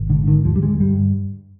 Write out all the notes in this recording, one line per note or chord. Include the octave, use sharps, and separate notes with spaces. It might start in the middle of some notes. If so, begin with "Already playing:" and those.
Already playing: G#1
G#2 D3
D3 D#3
D#2 F3
G3
D3 G#3
G2 G3